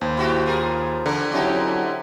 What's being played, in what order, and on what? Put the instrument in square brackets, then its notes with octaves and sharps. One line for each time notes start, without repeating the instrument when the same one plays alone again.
[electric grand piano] D#2 [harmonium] C5
[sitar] E4 F#4 G4
F4 G#4 A#4
[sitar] E2 A#3 A#4 [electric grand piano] D3
[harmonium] F#3 C4 E4 [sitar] C#4 D#4 G4